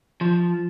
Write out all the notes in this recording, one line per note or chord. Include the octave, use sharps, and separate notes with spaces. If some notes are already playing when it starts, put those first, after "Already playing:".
F3